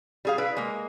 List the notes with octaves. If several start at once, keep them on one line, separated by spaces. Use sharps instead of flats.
G3 G#4 F5
E4 B4
G#3 A#3